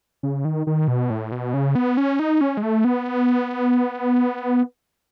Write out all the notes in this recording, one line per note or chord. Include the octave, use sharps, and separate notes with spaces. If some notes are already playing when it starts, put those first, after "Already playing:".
C#3
D#3
D#3
B2
A2
B2
C#3
B3
C#4
D#4
C#4
G#3
A3
B3